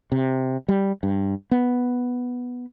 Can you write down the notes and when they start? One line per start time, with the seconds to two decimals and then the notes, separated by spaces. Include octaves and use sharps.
0.12 C3
0.68 G3
1.03 G2
1.51 B3